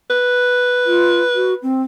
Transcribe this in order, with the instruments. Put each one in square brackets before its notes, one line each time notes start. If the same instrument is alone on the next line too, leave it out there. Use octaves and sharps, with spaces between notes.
[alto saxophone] B4
[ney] F4
F#4
C4